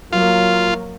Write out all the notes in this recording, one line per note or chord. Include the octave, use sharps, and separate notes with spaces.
F#3 A#3 F4